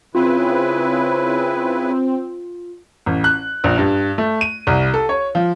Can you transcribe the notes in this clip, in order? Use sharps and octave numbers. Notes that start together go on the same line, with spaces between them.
C#3 C4 E4 F4 B4
A1
F#6
A#1
G2
A3
D#7
C2
A4
C#5
F3